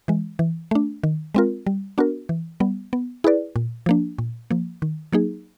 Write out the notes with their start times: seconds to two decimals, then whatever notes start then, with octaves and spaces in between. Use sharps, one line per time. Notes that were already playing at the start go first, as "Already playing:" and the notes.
0.08 E3 G#3
0.39 E3
0.71 A3 D4
1.03 D#3
1.35 G#3 C4 F4 A#4
1.66 G3
1.98 B3 D4 F#4 A#4
2.29 E3
2.60 G3 B3
2.93 B3
3.24 E4 G#4 B4 D5
3.56 A#2
3.86 F3 A#3 D4
4.18 A#2
4.51 F3 A#3
4.82 D#3
5.12 F#3 A#3 D#4 G#4